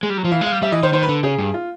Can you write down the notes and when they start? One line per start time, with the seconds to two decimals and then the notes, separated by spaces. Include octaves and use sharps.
0.03 G#3
0.10 G3
0.17 F#3
0.25 F3
0.31 E3 F5
0.41 G#3
0.46 F5
0.52 G3
0.62 G3 E5
0.72 E3 D#5
0.83 D#3 C5
0.93 D#3 C5
1.03 B4
1.09 D3
1.23 C#3 G#4
1.38 G2
1.54 F4